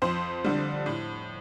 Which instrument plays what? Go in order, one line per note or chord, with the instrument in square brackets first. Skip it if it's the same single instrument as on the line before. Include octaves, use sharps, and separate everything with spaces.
[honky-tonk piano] F2 C5
D3 G3
A2